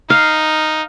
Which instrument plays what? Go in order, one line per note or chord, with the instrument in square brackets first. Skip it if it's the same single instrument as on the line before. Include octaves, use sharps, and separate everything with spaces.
[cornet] D#4 [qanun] F5